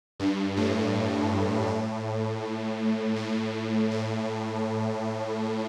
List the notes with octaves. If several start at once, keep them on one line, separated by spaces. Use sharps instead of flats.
G2
A2
A2
A2
A2